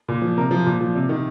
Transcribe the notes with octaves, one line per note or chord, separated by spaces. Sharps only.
A#2
F3
C3 A#4
F3
A#2
F3
C3
D#3